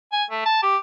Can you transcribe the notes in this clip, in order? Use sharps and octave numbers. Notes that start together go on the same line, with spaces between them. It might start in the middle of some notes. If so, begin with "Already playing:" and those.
G#5
A3
A5
G4